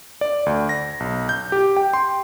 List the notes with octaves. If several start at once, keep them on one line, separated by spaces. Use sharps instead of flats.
D5
D2
A#6
B1
G6
G4
G5
C6